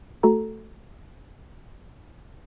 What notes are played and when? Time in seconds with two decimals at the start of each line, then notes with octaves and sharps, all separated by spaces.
0.23 A3 F#4 A4 A#5